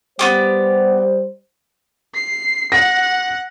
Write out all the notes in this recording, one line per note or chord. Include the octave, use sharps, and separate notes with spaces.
G3 B3 C#4 G4 C5
C7
F#5 A#6